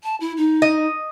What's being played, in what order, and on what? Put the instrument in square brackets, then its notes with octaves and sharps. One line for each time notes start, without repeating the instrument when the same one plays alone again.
[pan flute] A5
E4
D#4
[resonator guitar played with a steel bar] D#5